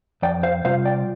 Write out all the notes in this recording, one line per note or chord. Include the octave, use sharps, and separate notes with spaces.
F2 D5 G5
C5 F5
C3 G3 F4 C5 F5
D5 G5